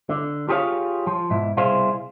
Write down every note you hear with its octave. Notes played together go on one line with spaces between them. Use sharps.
D3
F4 G4 G#4 A#4 C#5 F5
F3
G#2 B2 E4
C2 B2 E4 G#4 C5 F5